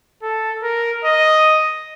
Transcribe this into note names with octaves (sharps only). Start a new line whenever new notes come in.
A4
A#4
D#5